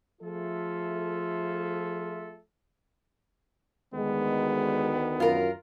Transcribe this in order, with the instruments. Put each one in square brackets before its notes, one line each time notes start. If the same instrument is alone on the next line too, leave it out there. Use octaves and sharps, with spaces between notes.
[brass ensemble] F3 A3 F4 G#4 A4 E5
[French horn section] D2 D#3 [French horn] G#3 [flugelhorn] B3
[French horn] F#2 [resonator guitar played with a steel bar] F4 A#4